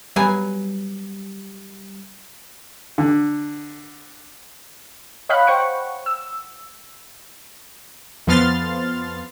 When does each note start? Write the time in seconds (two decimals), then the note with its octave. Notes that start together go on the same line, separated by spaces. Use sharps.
0.16 F#3 G3 B3 G#5
2.98 D3
5.29 C#5 D#5 F5 F#5 B5 F#6
5.47 C5 F#5 G5 C#6
6.06 E6
8.27 F2 F3 B3 C6 F6 A6